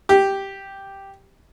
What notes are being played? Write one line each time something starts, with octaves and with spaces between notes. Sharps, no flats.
G4